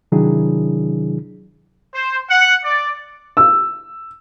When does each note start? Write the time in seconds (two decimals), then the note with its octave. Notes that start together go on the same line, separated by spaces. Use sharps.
0.12 C3 D#3 F#3 D4 E4 G#4
1.94 C5
2.30 F#5
2.64 D5
3.37 E6